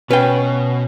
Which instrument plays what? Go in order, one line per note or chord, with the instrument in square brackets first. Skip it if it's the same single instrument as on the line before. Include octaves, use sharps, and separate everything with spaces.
[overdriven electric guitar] B2 [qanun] C#4 [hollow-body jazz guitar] B4 G5